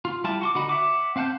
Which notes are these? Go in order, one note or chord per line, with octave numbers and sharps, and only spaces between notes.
F4
G3 E4 F4 A5
F#4 C6 D6
D3 D#4 F#4 F#5 B5
E5 F#5 D6
C4 F5 F#5 A5 G6